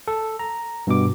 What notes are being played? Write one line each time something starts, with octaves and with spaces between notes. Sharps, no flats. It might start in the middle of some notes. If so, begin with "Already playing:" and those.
A4
A#5
G2 B2 D6